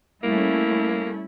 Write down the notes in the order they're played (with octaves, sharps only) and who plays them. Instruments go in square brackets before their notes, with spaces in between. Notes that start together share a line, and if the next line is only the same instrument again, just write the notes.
[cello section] G3 A3 C#4 [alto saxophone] A#3 [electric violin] E4